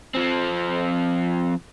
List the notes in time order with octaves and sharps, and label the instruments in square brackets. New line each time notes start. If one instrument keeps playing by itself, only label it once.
[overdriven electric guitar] F3 C4